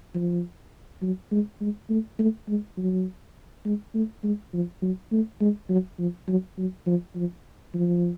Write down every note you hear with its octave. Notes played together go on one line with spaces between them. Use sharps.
F3
F#3
G#3
G#3
A3
A3
G#3
F#3
G#3
A3
G#3
F3
F#3
A3
G#3
F#3
F3
F#3
F#3
F3
F3
F3